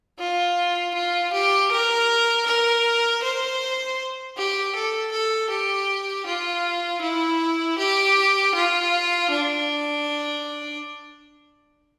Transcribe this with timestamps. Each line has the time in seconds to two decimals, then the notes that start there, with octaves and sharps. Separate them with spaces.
0.19 F4
0.94 F4
1.33 G4
1.72 A#4
2.46 A#4
3.23 C5
4.37 G4
4.75 A4
5.12 A4
5.50 G4
6.26 F4
7.02 E4
7.78 G4
8.55 F4
9.31 D4